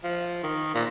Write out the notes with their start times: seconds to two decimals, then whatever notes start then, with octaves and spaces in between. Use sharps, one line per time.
0.04 F3
0.43 D#3
0.74 A#2